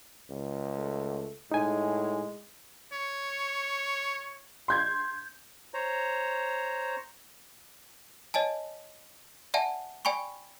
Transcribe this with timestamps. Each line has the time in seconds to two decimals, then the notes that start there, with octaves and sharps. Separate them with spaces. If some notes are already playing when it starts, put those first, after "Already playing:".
0.30 C#2
0.76 A3
1.52 A2 G#3 D#4 G#5
2.92 C#5
4.68 C6 G6 G#6
5.74 C5 C#5 A#5
8.34 C#5 D#5 G#5 A5
9.54 D5 E5 F#5 G#5 A5
10.05 D5 G5 G#5 B5 C#6